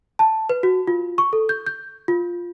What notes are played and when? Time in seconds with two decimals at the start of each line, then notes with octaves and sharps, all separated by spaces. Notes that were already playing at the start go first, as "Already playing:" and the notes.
0.19 A5
0.49 B4
0.63 F#4
0.87 F4
1.18 C#6
1.33 A4
1.49 G6
1.66 G6
2.08 F4